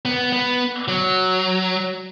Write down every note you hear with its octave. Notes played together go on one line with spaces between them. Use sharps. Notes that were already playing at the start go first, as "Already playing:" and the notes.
B3
B3
F#3